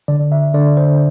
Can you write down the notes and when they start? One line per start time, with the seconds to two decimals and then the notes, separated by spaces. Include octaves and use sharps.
0.08 D3 D5
0.32 E5
0.54 D3 D5
0.77 C5